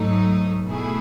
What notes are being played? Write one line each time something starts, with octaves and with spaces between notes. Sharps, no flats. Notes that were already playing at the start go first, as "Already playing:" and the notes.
Already playing: G#2 F#3 A3 D#4
B2 A3 E4 G#4